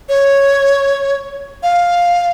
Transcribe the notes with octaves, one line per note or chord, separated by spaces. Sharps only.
C#5
F5